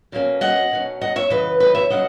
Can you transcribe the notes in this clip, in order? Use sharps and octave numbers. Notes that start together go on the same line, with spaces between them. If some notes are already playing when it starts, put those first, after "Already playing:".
B2 F#3 A#3 C#4
D#5 F#5
B2 F#3 C#4
D#5 F#5
C#5 E5
F#2 C#3 E3 B4 D#5
B4 D#5
C#5 E5
C#3 F#3 C#4 D#5 F#5